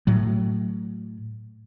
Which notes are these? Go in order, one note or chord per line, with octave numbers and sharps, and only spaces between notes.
A2 F#3